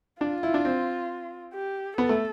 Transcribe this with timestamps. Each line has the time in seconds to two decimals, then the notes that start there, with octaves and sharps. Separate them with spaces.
0.21 D4 F4
0.43 E4
0.54 D4
0.65 C4
1.54 G4
1.98 B3 A4
2.09 A3